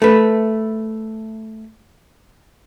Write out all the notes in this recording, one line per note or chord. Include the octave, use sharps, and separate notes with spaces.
A3 B4